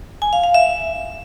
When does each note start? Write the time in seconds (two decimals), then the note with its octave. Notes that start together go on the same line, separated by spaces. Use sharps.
0.22 G#5
0.33 F5
0.44 F5
0.54 E5